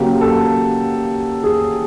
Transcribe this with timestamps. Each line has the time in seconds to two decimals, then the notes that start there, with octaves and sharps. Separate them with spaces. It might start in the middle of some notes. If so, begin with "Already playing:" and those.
Already playing: C#3 F#3 A#3 G4
0.21 A4
1.44 G#4